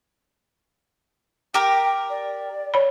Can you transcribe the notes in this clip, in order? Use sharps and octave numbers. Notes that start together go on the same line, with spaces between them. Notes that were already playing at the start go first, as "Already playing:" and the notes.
G4 A#4 G5
D5
C#5 B5